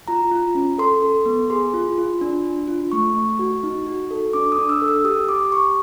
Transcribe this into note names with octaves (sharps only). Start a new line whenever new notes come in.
F4 A#5
F4
C#4
A4 C6
A4
B3
G#4 C6
F4
F4
D4
D4
F4
A3 C#6
A3
F#4
D#4
F#4
A4
D4 D6
D#6
D4
E6
A4
E6
G4 D#6
G4 D6
G4 C#6